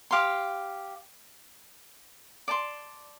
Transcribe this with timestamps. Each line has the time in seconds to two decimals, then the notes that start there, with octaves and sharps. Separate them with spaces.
0.11 G4 F5 C6
2.48 D5 A5 C6